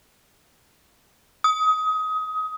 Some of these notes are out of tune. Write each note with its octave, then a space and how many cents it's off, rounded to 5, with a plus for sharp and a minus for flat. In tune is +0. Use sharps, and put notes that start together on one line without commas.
D#6 +25